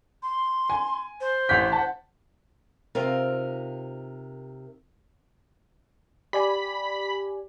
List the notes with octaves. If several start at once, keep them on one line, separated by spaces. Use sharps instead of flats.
C6
G#5
C5
A1 G6 B6
F#5 A5
C3 D#4 F4 A#4 C5
G4 D5 G#5 B5